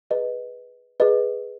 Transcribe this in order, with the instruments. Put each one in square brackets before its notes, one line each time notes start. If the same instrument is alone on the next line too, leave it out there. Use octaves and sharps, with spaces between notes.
[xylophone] G#4 B4 D#5
G#4 B4 D#5